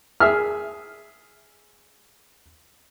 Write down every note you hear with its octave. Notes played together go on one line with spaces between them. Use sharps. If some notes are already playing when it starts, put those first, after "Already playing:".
G#4 E5 F6